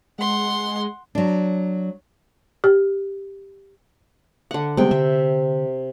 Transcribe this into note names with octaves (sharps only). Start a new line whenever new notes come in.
G#3 F#5 C6
F#3 D4
G4
D3 F#5
C3 G3 G#3 B3 G5
D3 E5